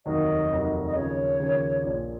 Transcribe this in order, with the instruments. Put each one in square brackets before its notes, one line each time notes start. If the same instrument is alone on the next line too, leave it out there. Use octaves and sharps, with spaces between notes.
[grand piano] F1 D#2 D#3 F#3 [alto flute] D#5
[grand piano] F1 D#2 D#3 F#3
[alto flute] D#5
[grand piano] D#2 C#3 F3 [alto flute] C#5
[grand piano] D#2 C#3 F3
A#1 A#2 F3